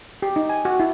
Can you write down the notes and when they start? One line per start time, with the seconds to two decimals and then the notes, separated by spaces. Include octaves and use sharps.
0.22 G4
0.36 D#4
0.50 G#5
0.65 F#4
0.80 E4